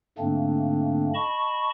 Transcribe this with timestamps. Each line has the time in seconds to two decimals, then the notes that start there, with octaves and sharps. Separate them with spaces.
0.18 G#2 D3 A3 A#3 C4 D4
1.14 D#5 A5 B5 C#6